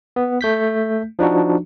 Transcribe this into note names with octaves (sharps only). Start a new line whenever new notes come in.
B3
A3 G6 B6
F3 D4 D#4 F#4